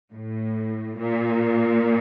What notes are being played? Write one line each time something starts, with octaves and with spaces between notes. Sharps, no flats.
A2
A#2